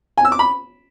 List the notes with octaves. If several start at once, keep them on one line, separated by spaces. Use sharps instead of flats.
G#5
E6
D6
B5